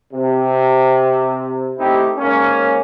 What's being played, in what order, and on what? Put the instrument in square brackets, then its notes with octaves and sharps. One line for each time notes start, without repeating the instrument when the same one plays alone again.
[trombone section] C3
A3 C4 D#4 E4 G4
G#2 A#3 C#4